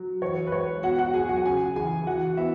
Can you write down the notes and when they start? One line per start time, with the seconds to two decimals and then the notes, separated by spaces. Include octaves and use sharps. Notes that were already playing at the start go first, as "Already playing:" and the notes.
Already playing: F#3
0.22 E3 C#5
0.47 B4
0.52 G#3 C#5
0.83 B2 F#4 F#5
0.98 F#4 F#5
1.14 F#3 G#4 G#5
1.29 F#4 F#5
1.45 C#3 G#4 G#5
1.76 E3 G#4 G#5
2.06 E3 F#4 F#5
2.37 B3 E4 E5